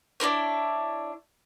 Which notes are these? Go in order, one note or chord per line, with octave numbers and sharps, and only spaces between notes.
D4 E4 A#4 C#5